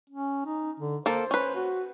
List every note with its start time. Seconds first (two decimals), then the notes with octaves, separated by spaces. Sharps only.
0.10 C#4
0.46 D#4
0.80 D3
1.06 A#3 A4 C5
1.31 C#4 B4
1.55 F#4